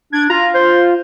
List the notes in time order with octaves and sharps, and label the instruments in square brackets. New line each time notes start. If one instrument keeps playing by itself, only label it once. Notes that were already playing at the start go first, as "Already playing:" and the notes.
[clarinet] D4 [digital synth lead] G#6
[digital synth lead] F4 [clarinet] A#5
[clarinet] C5